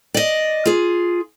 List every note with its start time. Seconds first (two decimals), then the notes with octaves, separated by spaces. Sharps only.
0.14 D5 D#5
0.66 F4 G#4